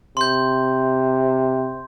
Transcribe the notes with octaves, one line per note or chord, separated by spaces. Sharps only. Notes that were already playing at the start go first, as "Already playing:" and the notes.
C3 C6 G6